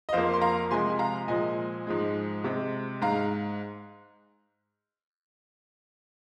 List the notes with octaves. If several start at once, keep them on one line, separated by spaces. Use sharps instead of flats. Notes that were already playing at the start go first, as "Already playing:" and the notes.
D#5
F2 F3 A#3 C5 F5
C6
F5 A#5
C3 F3 G#3 G#5 C6
G#5
F5 A#5
A#2 F3 G#3 D#5 G#5
G#2 F3 G#3
C3 G#3
G#2 G#3 F5 A#5